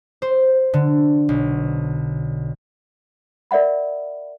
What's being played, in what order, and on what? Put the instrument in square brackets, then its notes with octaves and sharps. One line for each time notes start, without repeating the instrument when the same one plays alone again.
[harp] C5
D3
B1
[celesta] A#4 D5 E5 F#5 B5